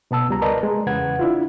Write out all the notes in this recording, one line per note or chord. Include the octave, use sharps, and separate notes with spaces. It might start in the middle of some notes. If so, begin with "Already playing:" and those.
B2 B3 A5 E6
C#2 G3 A#5
A#4 B4 D5 D#5 A5 A#5
G#3
E2 C#3 B4 F#5 G#6
D4 E4 F4